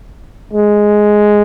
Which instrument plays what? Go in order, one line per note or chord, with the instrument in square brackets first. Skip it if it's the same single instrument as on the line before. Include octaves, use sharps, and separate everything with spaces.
[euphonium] G#3